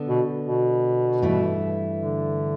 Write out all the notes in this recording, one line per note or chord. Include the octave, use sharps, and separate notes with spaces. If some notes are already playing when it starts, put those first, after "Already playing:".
Already playing: D3 B3 D4 A4
B2
B2
G2 E3 A3 E4
D3